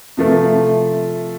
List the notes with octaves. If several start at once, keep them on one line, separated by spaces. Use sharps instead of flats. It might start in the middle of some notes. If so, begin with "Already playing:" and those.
C3 F3 A3